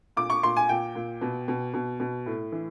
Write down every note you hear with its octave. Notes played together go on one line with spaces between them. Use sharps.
A#2 D6
C#6
A#2 C6
G#5
A#2 G5
A#2
B2
B2
B2
B2
A2
E3